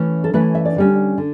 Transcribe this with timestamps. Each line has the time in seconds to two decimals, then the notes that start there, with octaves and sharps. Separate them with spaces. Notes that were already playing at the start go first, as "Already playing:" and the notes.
Already playing: E3 A3 C#4 E4
0.24 A4
0.33 E3 A3 C#4 E4 B4
0.55 E5
0.65 D5
0.76 D3 G3 C#4
1.18 D3